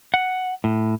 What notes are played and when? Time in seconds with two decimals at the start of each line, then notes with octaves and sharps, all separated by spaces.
0.14 F#5
0.64 A2